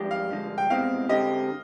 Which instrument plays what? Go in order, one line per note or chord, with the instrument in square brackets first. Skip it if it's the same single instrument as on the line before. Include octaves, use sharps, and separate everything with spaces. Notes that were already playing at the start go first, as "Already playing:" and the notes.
Already playing: [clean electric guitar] G2 F3 G#3 D4 G4
[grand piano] F5
[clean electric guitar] G2 D3 F3 G#3
[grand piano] G5
[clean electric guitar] C2 B2 G#3 C4 [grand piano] F5
[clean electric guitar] D3 G#3 C4 G4 [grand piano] D#5